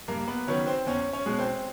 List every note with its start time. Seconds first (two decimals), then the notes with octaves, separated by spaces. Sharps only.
0.08 G2 A#3 A#4
0.28 B3 B4
0.47 D#3 F#3 B3 C#4 C#5
0.67 C4 C5
0.86 E2 C#4 C#5
1.13 C#4 C#5
1.26 B2 G#3
1.39 C4 C5